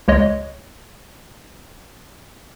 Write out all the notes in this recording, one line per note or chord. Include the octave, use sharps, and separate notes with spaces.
C#2 G#3 C#5 D#5